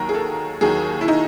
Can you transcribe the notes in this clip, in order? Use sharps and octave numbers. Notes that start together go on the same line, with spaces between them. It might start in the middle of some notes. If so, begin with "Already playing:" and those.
Already playing: D#2 D#3 F#3 A#4
G#4
A4
D#2 D#3 F#3 G#4
E4
D#4